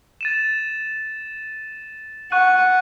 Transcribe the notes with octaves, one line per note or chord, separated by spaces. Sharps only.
A6 D#7 E7
F#5 C#6 F#6 D#7